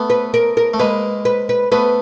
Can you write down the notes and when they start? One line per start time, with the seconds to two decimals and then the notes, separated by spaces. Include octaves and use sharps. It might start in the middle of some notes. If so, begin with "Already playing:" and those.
Already playing: A3 B3
0.10 B4
0.34 A#4
0.57 A#4
0.74 A3
0.79 G#3 A#3 B4
1.25 B4
1.49 B4
1.72 A3 B3 B4